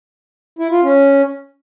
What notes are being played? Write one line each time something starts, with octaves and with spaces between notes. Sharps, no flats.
E4
F4
C#4